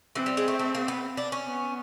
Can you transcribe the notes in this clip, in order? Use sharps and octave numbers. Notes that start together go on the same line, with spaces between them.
E3 C4
G3
G#3
A3
A3
A#3
B3
D4
C#4
B3